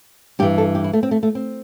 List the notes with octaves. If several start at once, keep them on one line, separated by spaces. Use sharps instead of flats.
G2 E3 G4
A4
G4
E4
A3
C4
A3
A3
C4